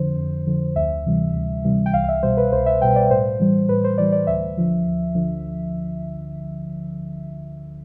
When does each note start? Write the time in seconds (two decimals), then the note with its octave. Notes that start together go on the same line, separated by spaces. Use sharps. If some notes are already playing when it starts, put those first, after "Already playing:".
Already playing: F2 D3 F3 C5
0.17 F2
0.47 D3 F3
0.76 D2 E5
1.06 C3 E3 G3
1.34 D2
1.64 C3 E3 G3
1.86 G5
1.94 C2 F5
2.04 F5
2.08 E5
2.23 B2 G3 C5
2.37 B4
2.53 C2 C5
2.66 E5
2.81 B2 G3 G5
2.96 D5
3.11 A2 C5
3.40 E3 G3
3.69 A2 B4
3.84 C5
3.98 E3 G3 D5
4.12 D5
4.27 D2 E5
4.57 D3 F3
4.87 D2
5.15 D3 F3